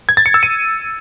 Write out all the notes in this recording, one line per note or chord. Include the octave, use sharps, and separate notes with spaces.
G#6
A6
C#7
E6
D#7